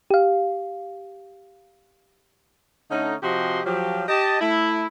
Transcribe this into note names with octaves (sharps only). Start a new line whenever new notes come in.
G4 F5
D3 A3 C#4 D#4
C3 F3 F#4 G4 D#5 C6
F3 F#3 G4
G4 D#5 A5
A3 E4